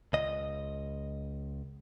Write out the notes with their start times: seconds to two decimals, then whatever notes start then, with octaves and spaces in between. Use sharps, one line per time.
0.13 C#2 D#5